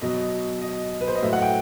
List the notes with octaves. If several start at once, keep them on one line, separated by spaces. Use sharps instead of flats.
B2 F#3 D#5
D#5
B4
C5
D#5
A2 F#3 E5
F#5
G5